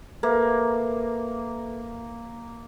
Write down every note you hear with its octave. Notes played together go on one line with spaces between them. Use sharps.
A#3 A4 B4 E5